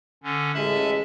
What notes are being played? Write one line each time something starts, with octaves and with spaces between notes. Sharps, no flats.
D3 C#4
A1 G#3 E5 A5 B5